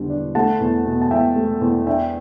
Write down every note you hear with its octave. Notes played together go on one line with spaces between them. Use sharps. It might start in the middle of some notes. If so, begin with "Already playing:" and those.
Already playing: E2 D3 G3
D4
A3 F#5 A5
E2
B2
A5
E2 E5 G5
A3
E2
D4 E5 G5